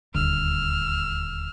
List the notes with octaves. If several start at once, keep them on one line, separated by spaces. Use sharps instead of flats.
D#1 D2 E6 F6